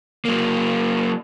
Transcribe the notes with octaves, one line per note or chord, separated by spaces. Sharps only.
F#3 A#3